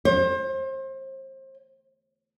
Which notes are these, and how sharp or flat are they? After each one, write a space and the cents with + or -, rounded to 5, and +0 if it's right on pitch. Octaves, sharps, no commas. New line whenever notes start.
C5 +30